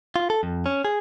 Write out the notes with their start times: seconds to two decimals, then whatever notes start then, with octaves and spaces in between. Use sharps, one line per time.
0.16 F4
0.30 A4
0.43 F2
0.66 C#4
0.85 G#4